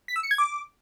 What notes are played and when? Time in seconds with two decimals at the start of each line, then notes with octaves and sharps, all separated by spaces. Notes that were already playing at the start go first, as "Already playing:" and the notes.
0.08 B6
0.16 E6
0.23 C#7
0.31 G#6
0.38 D6